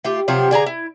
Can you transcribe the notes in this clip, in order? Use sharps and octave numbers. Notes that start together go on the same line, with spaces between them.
A3 F4 G4
C3 F3 F#3 F4
D3 G#4 B4 A#5
E4